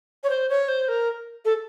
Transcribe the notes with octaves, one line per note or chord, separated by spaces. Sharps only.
C#5
C5
C#5
C5
A#4
A4